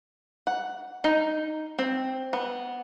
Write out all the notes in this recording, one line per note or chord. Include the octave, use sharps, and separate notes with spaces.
F#5
D#4
C4
B3